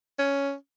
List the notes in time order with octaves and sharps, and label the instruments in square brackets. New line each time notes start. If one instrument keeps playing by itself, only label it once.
[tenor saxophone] C#4